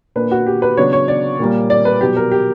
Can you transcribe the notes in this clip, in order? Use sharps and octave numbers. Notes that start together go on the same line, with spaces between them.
A#2 A#3 D4 B4
F#4
G4
B4
C#3 F#3 B3 D4 C#5
C#5
D5
A#2 G3 A#3
D5
B4
B2 F#3 B3 G4
A#4
G4